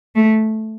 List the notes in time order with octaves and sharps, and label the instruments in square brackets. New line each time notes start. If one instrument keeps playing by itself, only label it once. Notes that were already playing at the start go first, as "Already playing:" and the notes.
[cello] A3